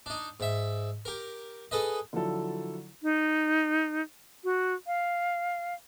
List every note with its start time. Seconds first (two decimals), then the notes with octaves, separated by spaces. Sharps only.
0.06 D4 D#4
0.40 G#2 E5
1.05 G4 A#4
1.71 G#4 A4 B4 D#5
2.13 D3 F3 F#3 E4 A4
3.03 D#4
4.44 F#4
4.87 F5